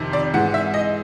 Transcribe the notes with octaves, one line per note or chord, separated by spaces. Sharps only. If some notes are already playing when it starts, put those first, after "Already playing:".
Already playing: F2 C3 D#3
D5
G#2 E3 F#5
E5
D#5